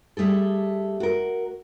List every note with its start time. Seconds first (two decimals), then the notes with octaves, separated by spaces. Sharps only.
0.17 G3 A3 G#4 A4
1.00 F#4 A#4